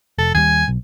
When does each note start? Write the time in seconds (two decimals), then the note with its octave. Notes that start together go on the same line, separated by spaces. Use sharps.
0.18 F1 A4
0.34 D#2 G3 G#5
0.68 B1